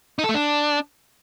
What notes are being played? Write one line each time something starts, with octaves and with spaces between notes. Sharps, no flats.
D#4
A4
A3
D4